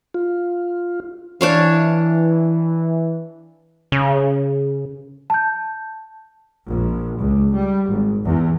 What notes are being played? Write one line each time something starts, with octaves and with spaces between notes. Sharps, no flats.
F4
E3 D4 C#5 F5
C#3
A5 G6
A#1
C#2
G3
G#1
E2